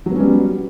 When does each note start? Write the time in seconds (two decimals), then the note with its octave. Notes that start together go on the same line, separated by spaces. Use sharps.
0.06 F#3
0.11 B3
0.15 C#4
0.20 G3